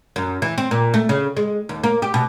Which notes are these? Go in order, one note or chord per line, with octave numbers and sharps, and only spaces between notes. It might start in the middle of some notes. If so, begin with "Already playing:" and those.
F#2
E3
C4
A#2
A3
C#3
G#3
D#2
A#3
G4
B2